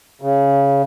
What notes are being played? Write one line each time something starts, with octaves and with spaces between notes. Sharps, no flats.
C#3